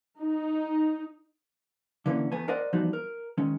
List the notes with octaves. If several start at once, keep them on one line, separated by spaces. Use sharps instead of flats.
D#4
D3 E3 A#3 C#4
E2 A3 B3 G#5
A#4 C5 D5 D#5 F#5
E3 F3 G3 B3 D#4 F#4
A#4
D#3 G#3 C#4